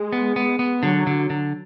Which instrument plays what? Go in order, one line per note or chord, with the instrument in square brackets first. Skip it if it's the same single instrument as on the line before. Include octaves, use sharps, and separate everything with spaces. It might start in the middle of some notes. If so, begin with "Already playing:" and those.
Already playing: [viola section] G#3
[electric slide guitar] B3
B3
B3
[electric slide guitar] D3 [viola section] F#3
[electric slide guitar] D3
D3